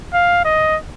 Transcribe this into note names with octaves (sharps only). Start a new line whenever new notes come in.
F5
D#5